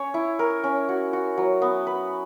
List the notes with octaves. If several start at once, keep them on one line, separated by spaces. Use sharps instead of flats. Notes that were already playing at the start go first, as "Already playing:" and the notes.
Already playing: C#4 C#5
E4
A#4
C#4
F#4
F#4
F#3
B3
B4